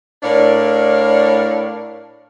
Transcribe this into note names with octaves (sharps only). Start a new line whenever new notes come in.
A2 D4 A#4 C#5 D5 F5